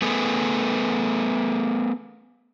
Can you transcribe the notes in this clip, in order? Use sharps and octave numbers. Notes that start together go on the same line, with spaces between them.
A3 B3 G#4